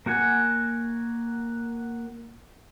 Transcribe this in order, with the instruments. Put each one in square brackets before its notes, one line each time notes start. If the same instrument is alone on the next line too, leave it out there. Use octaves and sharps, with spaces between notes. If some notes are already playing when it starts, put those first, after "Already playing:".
[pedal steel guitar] A#3 F#4 F#5 G#5